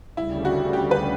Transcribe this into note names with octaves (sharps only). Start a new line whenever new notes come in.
D2 C#3 G3 E4
F#4
G4
B4